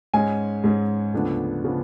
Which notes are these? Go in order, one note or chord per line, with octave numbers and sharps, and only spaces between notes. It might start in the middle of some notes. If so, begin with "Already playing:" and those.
G#2 G#3 C#4 G#5
G#2 G#3 C#4
D2 C#3 F3 B3 D4
C#3 F3 B3 D4